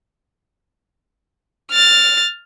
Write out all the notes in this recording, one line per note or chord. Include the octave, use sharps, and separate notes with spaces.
F6 A6